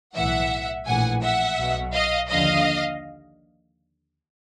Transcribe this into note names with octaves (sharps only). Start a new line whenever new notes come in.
B1 A2 E3 E5 F#5
A#1 A2 E3 F#5 G#5
E5 F#5
B1 B2
D#5 F5
D#2 D3 F3 D#5 F5